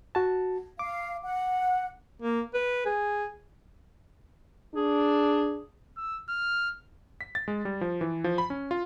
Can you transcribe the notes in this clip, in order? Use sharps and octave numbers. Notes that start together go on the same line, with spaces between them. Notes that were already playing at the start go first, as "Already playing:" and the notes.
F#4 A5
F5 D6
F#5
A#3
B4
G#4
D4 G#4
E6
F6
B6
A6
G#3
G3
F3
E3
F3
B5
C#4
F4